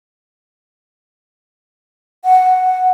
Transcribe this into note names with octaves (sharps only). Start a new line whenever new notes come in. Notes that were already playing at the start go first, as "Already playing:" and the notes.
F#5